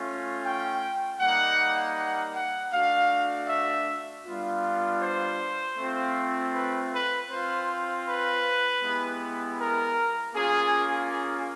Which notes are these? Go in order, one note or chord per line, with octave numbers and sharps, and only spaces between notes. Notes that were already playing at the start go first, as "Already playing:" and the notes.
Already playing: A3 C#4 F4
G5
G3 A#3 D#4 F#5
F#5
F#5
A3 D4 F#4 F5
E5
G3 B3 D4 F4
C5
A3 C4 F4
B4
B4
C4 F4 C5
B4
G#3 B3 E4 G4
A#4
A#3 C#4 F4 G#4
G#4